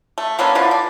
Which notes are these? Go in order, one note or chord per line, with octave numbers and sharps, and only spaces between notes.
A3
A#3 B3 C#4 D4
D3 E3 F3 D4
D5